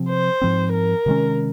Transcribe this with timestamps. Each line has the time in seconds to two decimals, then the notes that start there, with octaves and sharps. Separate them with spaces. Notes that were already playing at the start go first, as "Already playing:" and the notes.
Already playing: C3 F3 C4
0.09 C5
0.42 G#2 F3 C4
0.73 A#4
1.06 C3 D#3 G#3 C#4